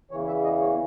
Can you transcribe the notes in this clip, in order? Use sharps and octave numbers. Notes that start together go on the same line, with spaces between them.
E2 C#3 E3 C#5
E5
D#5
C#5